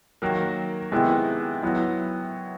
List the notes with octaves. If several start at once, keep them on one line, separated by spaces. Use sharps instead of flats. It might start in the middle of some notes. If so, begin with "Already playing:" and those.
D#3 F#3 A#3
C3 D#3 G#3 B3 E4
F#3 B3 E4